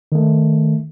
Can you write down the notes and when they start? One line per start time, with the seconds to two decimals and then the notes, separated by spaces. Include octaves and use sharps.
0.12 D#3 A3